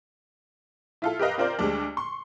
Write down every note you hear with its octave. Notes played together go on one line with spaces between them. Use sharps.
E4 F4 A4
G4 A#4 B4 D#5 F5
C4 F4 A#4 C5 D5
D2 G3 G#3 D4
C6 C#6